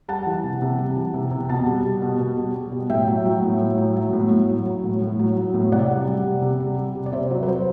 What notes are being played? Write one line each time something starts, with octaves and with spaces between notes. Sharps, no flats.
G3 F#5 A5
E3
C3
C3
G3
E3
C3
C3
B2 F#5 A5
G3
G3
B2
B2
G3
G3
B2
A2 E5 G5
F#3
F#3
A2
A2
F#3
F#3
A2
A2
F#3
F#3
A2
A2
F#3
F#3
A2
C3 D5 F#5
G3
G3
C3
C3
G3
G3
C3
D5
C3 C5 E5
F#3
B4
F#3 C5